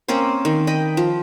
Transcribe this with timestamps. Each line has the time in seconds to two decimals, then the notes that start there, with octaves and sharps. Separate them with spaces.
0.08 A#3 C4 C#4 C5
0.45 D#3
0.67 D#5 G5 B5
0.97 F3